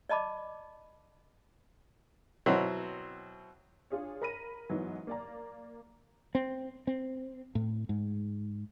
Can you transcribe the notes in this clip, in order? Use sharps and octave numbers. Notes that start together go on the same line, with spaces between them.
D5 D#5 A5 B5 D6
B2 F#3 C4 E4
D4 F4 G#4 C#5
A#4 B5 A#6 D#7
G#2 E3 F#3 B3 D#4
A#3 D5 A#5
C4
C4
A2
G#2